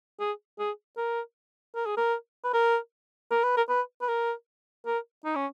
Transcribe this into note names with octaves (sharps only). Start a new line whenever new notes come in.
G#4
G#4
A#4
A#4
G#4
A#4
B4
A#4
A#4
B4
A#4
B4
B4
A#4
A#4
D#4
C#4